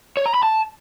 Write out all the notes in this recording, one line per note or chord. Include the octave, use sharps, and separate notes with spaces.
C#5
A#5
B5
A5